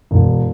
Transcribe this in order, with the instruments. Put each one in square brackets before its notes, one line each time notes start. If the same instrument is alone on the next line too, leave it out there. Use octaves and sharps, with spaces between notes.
[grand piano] E1